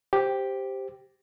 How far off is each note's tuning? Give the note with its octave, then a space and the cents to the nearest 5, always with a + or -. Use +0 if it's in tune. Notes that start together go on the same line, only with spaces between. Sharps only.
G4 +0 C5 +0